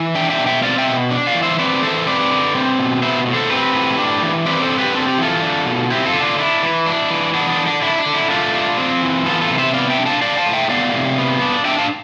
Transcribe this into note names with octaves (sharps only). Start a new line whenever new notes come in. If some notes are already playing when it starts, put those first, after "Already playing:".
Already playing: E3
D4 E5 G5
E5 G5
B2
E5 G5
C4 D5 F5
E5 G5
B2
D4
D5 F5
E3
C5 E5
C4 B4 D5
E3 A4 C5
C4 B4 D5
D3
C4
B2
B3 C5 E5
A2
A4 C5
C4 G4 B4
A2
D4
E3
C4 B4 D5
A4 C5
D3
G4 B4
C4 A4
G4
E3 F4 A4
D4
B2
C4 E4 G4
F4 A4
D3
D4 F4
D4 E4
E3
D4
E3
B3 D4
D4
D3
D4
D4 E4
D4
D3
E4
A3 D4 F4
D4
C4
E3
B3 F4 A4
F4 A4
C3
C5 E5
B3 D5 F5
E5 G5
D4
F5 A5
D4 D5 F5
F5 A5
A2
E5 G5
B3 D5 F5
C3
B3
D4
D4 E5 G5
F5 A5